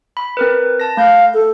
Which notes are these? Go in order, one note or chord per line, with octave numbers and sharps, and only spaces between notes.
B5
C4 A#4 B4
A5 A#6
A3 F5 G6
A4